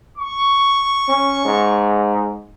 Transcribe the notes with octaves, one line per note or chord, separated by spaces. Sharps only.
C#6
C#4
G#2